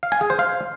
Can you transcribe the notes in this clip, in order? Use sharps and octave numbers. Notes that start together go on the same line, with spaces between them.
F5
G#5
G#4
C5
F5